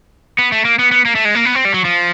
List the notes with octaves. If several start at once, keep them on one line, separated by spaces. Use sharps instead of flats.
B3
A3
A#3
B3
B3
A#3
A3
G#3
A#3
B3
C4
G3
F#3
F3